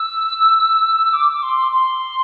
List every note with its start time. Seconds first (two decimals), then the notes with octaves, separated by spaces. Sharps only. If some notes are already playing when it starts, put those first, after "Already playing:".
Already playing: E6
1.13 D6
1.33 D6
1.43 C6
1.72 C6